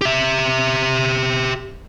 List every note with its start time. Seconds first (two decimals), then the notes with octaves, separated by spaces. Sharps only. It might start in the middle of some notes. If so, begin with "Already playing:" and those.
0.01 G4 E5